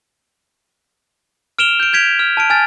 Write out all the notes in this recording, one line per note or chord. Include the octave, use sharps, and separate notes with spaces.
F6 D7 E7 F7 G7
G6 D7
G6 G#6 B6 D7 F7
F6
A5 F6 D7
G#5 F6 A6